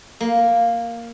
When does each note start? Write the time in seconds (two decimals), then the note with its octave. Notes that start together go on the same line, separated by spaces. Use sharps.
0.20 A#3